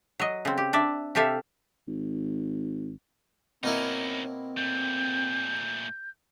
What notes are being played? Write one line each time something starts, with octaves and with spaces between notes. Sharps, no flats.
F#3 D#5
C#3 C4
G4
D4 D5 E5
C3 G4 A4 E5 F5
G#1
B2 A#3 C4 C#4 D#4 E4
A#2 A3 G6